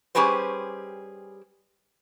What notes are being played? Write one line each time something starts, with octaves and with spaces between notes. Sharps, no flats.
G3 C#4 G4 G#4 B4 C5